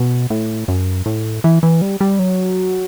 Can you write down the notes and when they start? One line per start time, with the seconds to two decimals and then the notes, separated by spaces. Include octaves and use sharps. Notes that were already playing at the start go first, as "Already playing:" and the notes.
Already playing: B2
0.30 A2
0.68 F#2
1.06 A2
1.44 E3
1.63 E3
1.82 G3
2.01 G3
2.19 F#3